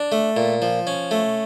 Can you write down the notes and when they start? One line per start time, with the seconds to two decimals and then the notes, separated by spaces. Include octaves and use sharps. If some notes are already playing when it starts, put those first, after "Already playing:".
Already playing: D4
0.12 A3
0.37 A#2
0.62 F3
0.87 C#4
1.11 A3